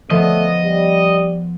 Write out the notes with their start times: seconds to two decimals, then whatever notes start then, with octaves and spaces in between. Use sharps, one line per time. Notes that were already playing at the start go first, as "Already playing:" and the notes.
0.10 F3 A3 B3 D#5
0.65 G3